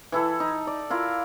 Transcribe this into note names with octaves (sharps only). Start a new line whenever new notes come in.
E3 E4 A4
D#4
D5
E4 F4 A#4